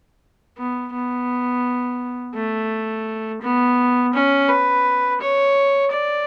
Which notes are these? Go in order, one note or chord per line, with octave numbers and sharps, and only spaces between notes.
B3
B3
A3
B3
C#4
B4
C#5
D5